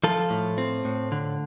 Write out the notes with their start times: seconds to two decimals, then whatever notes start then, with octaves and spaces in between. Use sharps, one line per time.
0.04 F3 F4 A4
0.30 A2
0.58 C4
0.85 A2
1.12 D3